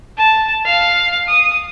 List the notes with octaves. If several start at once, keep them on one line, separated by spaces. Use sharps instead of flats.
A5
F5
D#6